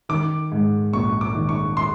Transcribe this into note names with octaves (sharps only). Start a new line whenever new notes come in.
D#3 D6
G#2
A#1 C#6
D6
D#3
C#6
C6